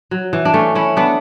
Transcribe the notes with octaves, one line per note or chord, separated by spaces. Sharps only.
F#3
E3
D4
A3 C#4
C#4 E4
B3 D4